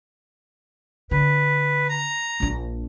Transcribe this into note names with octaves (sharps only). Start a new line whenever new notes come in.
D3 B4
A#5
A#1 D4